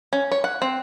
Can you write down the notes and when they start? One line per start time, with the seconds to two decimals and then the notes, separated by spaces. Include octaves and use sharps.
0.13 C#4
0.32 C#5
0.44 F#5
0.62 C4